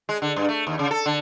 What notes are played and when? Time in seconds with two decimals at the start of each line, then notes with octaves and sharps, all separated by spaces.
0.09 G#3
0.22 D3
0.36 G2
0.48 A3
0.67 D#2
0.79 C#3
0.91 A4
1.06 D3